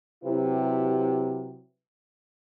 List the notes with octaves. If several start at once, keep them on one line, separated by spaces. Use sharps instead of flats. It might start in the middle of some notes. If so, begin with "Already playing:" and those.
C3 F#3 E4 G4 B4